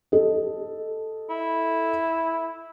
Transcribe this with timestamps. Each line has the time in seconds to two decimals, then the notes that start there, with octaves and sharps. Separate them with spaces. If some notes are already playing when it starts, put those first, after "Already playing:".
0.12 A4 D#5
1.30 E4